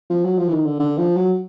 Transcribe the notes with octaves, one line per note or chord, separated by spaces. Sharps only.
F3
F#3
F3
E3
D#3
D3
D3
F3
F#3